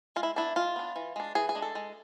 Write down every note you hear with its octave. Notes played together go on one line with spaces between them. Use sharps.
G#3 F4
E4
B3 D4 E4
G#3 F4
B3 D4
E3
G#3 D4
E3 G#4
G#4
G#3 D4
A4
G#3